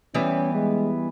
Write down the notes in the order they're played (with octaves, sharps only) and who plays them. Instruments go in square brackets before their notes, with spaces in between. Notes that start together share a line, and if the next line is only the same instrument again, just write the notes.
[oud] E3 G3 B3 [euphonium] C#4
[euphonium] G#3